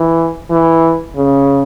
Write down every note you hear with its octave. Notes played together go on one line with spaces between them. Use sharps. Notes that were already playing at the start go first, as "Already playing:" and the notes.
Already playing: E3
E3
C#3